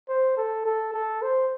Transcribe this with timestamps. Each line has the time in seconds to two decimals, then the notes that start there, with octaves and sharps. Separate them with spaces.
0.09 C5
0.37 A4
0.66 A4
0.93 A4
1.22 C5